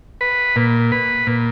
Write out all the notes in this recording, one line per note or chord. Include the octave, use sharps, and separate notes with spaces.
B4
A#2
B4
A#2